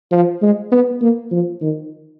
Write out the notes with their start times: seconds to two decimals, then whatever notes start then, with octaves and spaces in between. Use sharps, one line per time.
0.12 F3
0.42 G#3
0.72 B3
1.01 A#3
1.32 F3
1.61 D#3